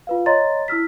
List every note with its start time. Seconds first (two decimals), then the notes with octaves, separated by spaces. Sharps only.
0.07 F4 B4 F5
0.26 C#5 D#5 A#5 C6 A6
0.68 E4 E6 F6 B6